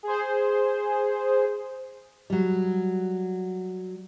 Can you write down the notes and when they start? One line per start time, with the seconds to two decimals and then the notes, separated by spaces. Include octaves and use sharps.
0.03 G#4 C5
2.30 F#3 G3